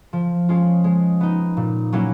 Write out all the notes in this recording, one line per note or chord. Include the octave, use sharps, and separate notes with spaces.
F3
G#3 C#4 F4
G#3
B3 D#4
A#2
F#3 A#3 C#4 E4